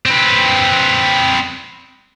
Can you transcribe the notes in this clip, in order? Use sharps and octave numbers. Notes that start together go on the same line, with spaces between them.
C4 B4